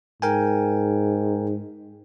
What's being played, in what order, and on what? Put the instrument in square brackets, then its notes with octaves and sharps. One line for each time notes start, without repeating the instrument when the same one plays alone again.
[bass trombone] G#2 [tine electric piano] A#4 G5 G#5